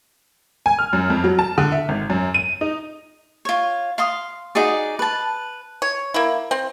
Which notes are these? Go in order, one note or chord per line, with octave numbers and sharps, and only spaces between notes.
G#5
F6
F#2
F2
F#3
A5
D3
E5
G#1
F#2
D#7
D#4
F4 C#5
F5 C6 D#6
D#4 F#4 G#4 D5
B4 A5
C#5
A#3 E4
C4